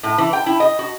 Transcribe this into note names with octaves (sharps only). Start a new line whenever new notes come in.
A2
E3
G5
E4
D#5
F#4